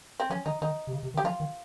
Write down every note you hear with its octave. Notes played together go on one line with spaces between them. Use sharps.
C4
F3 C#4
D#3 D#4
D#3 D#4
C3
C#3
C3
D#3
G4
F3 F4
D#3